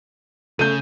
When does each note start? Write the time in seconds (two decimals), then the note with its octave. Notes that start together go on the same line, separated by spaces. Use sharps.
0.59 C#3 A3 G6 D#7